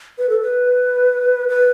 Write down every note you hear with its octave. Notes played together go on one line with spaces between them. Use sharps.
B4
A4
B4
B4